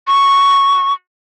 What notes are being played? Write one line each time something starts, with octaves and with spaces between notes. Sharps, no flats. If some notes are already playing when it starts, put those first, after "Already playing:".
C#6